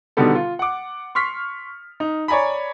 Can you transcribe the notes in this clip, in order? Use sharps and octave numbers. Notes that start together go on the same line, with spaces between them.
B2 D3 D#3 G3 B3 A4
F4
F#5 D6
C6 C#6 F6 B6
D#4
C#5 D5 G#5 A#5 B5